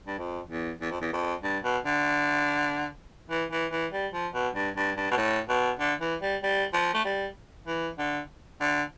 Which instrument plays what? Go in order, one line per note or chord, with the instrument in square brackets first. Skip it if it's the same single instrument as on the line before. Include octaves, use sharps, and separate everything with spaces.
[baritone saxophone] G2
F2
E2
E2
F2
E2
F2
G2
B2
D3
E3
E3
E3
G3
F3
B2
G2
G2
G2
B2
A2
B2
D3
E3
G3
G3
F3
A3
G3
E3
D3
D3